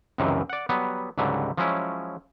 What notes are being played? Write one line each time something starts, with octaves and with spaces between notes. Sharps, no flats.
C#2 F#2 C3 D#3 E3
D5 F#5
F#3 G3 B3
C#2 G#2 D3 F#3 G3
F3 F#3 G#3 C#4 E4